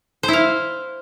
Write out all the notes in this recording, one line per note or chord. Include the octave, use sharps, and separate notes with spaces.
C5
E4
F5